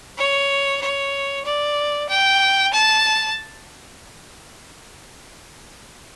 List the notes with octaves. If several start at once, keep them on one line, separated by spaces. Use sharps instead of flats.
C#5
C#5
D5
G5
A5